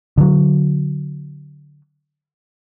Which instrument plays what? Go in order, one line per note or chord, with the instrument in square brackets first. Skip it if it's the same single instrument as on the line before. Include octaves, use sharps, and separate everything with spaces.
[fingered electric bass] D3 F#3